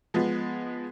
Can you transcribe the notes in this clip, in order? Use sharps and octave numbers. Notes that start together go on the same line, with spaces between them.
F3 G#3 B3